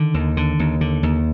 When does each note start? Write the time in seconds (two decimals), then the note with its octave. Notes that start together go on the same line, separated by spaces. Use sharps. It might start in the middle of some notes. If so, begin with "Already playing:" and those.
Already playing: D3 D#3
0.14 D#2
0.37 D3
0.59 D#2
0.81 D3
1.03 D#2